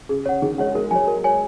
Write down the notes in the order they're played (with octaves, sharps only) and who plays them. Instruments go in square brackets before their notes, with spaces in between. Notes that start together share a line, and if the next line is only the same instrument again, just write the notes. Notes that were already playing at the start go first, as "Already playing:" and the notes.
[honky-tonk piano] C#3 [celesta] G#4
[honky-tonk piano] C#3 [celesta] C#5 F#5
[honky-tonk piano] D#3 [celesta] G#4
[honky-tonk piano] G#3 [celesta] C#5 F#5
[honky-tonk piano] G#3 [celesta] A#4
[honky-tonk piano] F#3 [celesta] C#5 G#5
[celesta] A#4
C#5 G#5